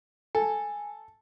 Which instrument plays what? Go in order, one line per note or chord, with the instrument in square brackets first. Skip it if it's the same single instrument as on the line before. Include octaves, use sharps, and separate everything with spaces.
[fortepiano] A4 [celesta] G#5